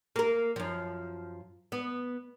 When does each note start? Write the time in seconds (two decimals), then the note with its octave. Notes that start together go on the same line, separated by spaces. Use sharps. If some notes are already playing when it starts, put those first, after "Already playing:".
0.16 A#3 A#4
0.56 F#2 F3
1.72 B3